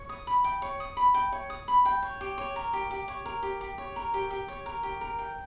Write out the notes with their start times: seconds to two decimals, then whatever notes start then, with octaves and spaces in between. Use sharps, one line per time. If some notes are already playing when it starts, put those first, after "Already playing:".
Already playing: C#5
0.09 D#6
0.27 B5
0.44 G5
0.62 C#5
0.80 D#6
0.97 B5
1.14 G5
1.32 C#5
1.50 D#6
1.68 B5
1.85 G5
2.03 C#5
2.21 G4
2.38 C#5
2.56 A#4
2.73 G4
2.91 G4
3.08 C#5
3.26 A#4
3.43 G4
3.61 G4
3.78 C#5
3.96 A#4
4.14 G4
4.30 G4
4.48 C#5
4.66 A#4
4.83 G4
5.01 A#4
5.19 G5